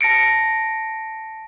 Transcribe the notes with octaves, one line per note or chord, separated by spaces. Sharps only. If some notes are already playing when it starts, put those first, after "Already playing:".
A5 A#6 C#7 D7